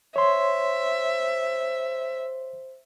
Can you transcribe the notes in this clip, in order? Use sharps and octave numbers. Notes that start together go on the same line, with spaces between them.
C5 C#5 E5 C6